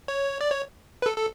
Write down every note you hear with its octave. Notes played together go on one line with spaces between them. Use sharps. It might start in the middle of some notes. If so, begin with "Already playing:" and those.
C#5
D5
C#5
B4
A4
A4